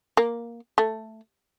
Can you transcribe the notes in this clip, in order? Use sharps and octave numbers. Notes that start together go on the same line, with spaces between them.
A#3
A3